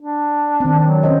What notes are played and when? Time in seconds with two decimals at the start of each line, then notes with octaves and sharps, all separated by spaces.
0.01 D4
0.60 D#3 C4
0.87 F#3
1.03 C#4 C5 D#5